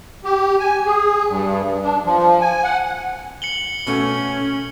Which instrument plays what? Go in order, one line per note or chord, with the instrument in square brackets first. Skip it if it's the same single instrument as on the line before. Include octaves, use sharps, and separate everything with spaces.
[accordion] G4
G#5
G#4
G2
D4
F3
G#5
F#5
[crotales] C#7 F#7 G7
[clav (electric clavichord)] B2 A3 F#5 [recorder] C#4